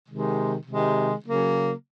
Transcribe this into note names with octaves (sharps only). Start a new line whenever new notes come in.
C3 D#3 G#3
C3 D#3 G#3
C#3 F#3 A#3